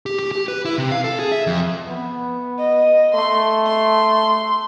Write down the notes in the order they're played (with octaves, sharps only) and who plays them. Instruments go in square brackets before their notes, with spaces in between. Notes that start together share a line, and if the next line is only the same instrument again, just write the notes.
[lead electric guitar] G4
G4
G4
B4
E4
C3
F5
A4
G#4
E5
F2
[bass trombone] B3
[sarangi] D#5
[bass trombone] A3 [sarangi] C6
[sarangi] C6